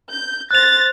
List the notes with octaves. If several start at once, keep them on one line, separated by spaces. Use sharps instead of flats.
G6
C5 F#6 A6 A#6 F7